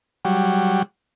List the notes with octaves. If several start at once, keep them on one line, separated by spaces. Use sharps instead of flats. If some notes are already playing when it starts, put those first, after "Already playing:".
F#3 G3